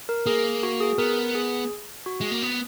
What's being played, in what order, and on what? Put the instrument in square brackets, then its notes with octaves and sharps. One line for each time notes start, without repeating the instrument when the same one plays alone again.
[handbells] A#4
[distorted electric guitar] A#3 [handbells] G#4
[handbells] F#4
G#4
[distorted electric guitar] B3 [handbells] A#4
[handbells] G#4
F#4
[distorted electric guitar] G#3
A#3
B3